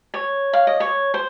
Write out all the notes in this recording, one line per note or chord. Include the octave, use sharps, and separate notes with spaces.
C#5
F5
D#5
C#5
C5